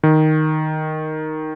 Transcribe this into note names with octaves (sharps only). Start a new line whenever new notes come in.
D#3